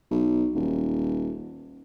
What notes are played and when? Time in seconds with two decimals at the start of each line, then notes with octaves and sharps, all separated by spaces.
0.11 B1
0.55 D#1